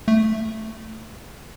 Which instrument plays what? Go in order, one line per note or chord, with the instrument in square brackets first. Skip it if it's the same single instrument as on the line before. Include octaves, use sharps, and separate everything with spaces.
[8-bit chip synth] A3